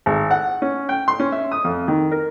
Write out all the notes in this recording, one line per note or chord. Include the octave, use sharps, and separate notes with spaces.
G#1
F#5
C#4
G5
C6
C#4
E5
D#6
F2
D#3
A#4